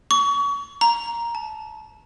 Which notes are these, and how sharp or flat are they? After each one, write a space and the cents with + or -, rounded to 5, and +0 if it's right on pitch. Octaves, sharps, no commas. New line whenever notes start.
C#6 +30
A#5 +5
A5 -25